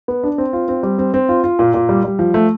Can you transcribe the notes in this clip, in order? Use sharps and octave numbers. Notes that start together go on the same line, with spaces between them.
B3
D4
C4
F4
C4
G3
C4
C4
F4
F4
A#2
A#2
G3
G3
F3
A3